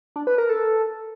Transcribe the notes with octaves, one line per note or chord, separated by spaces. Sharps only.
D4
B4
A#4
A4